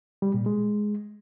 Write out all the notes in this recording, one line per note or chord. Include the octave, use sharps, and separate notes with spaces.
G3
A#2
G#3